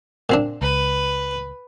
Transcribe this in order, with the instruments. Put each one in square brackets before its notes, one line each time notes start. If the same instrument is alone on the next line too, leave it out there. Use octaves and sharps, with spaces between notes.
[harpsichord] A#2 C4 D4
[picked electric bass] C#2 [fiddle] B4